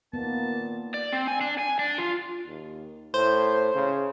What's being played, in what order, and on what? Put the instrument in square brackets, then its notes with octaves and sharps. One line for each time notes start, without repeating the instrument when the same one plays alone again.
[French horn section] A#2 D#3 A#3 [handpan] B3 [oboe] A5
[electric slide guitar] D5
C4
G#5
D4
G#5
D4
F4
[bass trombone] D#2
[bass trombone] A2 [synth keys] C5
[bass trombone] C#3